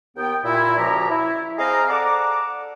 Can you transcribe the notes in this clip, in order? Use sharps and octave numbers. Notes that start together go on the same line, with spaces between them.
D#2 B3 G5
A#2 E4
C#2 A#2 F3 F#4 G4 A#5
E4
C4 G#4 D#5 F5 A#5
A4 D5 F#5 A#5 D6